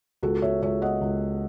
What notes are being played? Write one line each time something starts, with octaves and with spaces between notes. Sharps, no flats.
C#2 F#4 A4
C#5 E5
C#2 C#5 E5
D#5 F#5
C#2